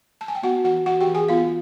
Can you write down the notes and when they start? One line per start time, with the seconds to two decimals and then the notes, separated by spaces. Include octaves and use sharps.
0.21 A5
0.28 G#5
0.35 G5
0.43 B3 F#4 F#5
0.64 E3 F#4 F#5
0.86 E3 F#4 F#5
1.01 G4 G5
1.07 E3
1.15 G#4 G#5
1.29 B3 F4 F5